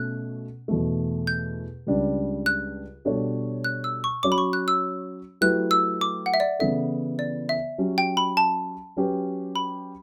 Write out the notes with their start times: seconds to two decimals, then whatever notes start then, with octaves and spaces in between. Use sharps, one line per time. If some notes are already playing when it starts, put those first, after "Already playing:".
Already playing: B2 A3 C#4 F#6
0.68 E2 B2 A3
1.27 G6
1.87 C#2 C#3 G3 D4
2.46 F#6
3.05 B2 G3 D4 A4 C#5
3.64 F#6
3.84 E6
4.04 C#6
4.23 F#3 C#4 F#4 C#5 D6
4.32 B5
4.38 C#6
4.53 F#6
4.68 E6
5.41 F#3 A3 E4 G4 B4 F#6
5.71 E6
6.01 D6
6.26 F#5
6.34 E5
6.40 D5
6.59 C#3 E3 B3 E4 A4 E5
7.19 D5
7.49 E5
7.78 F#3 C#4 G4
7.98 G5
8.17 B5
8.37 A5
8.97 F#3 C#4 G4 B4
9.56 B5